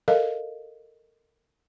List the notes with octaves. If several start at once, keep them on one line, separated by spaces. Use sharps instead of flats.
A4 A#4 D#5 F5